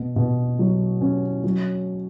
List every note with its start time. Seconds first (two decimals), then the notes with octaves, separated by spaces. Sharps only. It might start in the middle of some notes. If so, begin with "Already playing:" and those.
Already playing: B2
0.16 B2
0.59 F#3
1.01 C#4
1.44 F#3